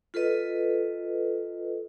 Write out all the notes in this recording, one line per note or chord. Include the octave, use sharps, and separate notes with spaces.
F4 A4 B4 D#5